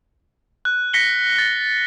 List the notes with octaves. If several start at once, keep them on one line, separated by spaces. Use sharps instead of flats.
F#6
A#6 B6 C#7 G7
A6